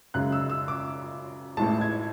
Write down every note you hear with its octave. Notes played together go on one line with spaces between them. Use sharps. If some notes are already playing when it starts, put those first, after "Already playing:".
F#2 C#3 G#3 F#6
E6
E6
D6
A1 A2 G#3 A5
G#6